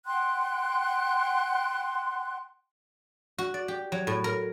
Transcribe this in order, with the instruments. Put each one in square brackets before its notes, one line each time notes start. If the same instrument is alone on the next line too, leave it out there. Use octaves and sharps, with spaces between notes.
[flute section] F#5 G5 C6 F#6
[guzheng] F#4
D5
G4
F#3
A2
A#4